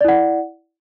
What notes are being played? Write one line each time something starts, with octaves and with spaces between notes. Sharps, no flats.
E4 D5 F#5